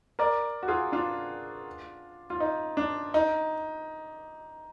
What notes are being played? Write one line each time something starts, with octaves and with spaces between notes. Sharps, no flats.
A#4 D5
F#4
F4 G#4
D4 F4
F4
D#4
D4
D#4